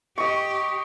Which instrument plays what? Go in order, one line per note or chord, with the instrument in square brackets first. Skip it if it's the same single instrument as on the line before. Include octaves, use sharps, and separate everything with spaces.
[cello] G4 [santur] D#5 C#6